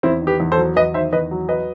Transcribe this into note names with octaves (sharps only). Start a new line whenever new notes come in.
E2 C4 E4
D#3
G4 B4
E2
A4 C5
F#3
E2 B4 D#5
D#3 C5 E5
E2 B4 D#5
F#3
B4 D#5